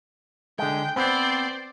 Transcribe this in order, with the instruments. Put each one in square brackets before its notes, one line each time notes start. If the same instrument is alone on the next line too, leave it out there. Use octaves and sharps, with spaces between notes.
[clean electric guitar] D3 G#3 [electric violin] G5
[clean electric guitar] B3 C4 [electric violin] C5 D5